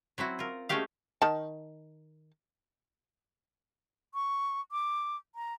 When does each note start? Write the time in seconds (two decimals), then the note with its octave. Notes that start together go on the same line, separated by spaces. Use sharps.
0.18 F#3 C4 E4 F#4
0.39 F4 A#4
0.69 G#3 A3 C#4 F#4 G4 F5
1.22 D#3 A5
4.14 C#6
4.72 D6
5.35 A#5